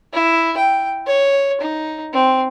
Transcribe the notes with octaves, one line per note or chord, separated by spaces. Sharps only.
E4
G5
C#5
D#4
C4